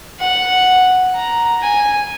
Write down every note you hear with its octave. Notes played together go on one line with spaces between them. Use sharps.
F#5
A#5
G#5